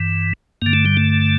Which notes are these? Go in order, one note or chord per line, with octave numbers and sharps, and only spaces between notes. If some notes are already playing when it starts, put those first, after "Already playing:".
Already playing: G2 E3
G2 D3 A#3
A3
G3
A3